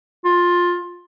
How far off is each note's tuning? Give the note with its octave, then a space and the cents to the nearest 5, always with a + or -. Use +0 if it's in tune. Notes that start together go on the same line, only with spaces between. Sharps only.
F4 +15